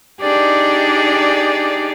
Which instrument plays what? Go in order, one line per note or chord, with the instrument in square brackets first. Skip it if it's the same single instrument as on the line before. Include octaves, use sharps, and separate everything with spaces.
[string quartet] D4 D#4 G4 G#4 D5